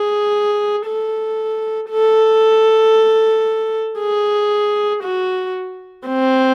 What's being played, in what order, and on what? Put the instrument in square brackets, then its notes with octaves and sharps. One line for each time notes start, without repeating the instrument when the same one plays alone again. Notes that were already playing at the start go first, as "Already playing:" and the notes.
Already playing: [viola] G#4
A4
A4
G#4
F#4
C4